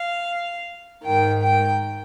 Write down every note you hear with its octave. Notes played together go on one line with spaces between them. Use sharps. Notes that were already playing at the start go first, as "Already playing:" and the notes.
Already playing: F5
G#2 D#3 G5
G5